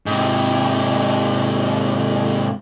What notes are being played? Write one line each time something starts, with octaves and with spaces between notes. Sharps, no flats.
G#2 C3